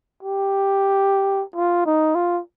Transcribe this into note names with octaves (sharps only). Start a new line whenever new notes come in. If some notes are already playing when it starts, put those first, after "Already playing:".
G4
F4
D#4
F4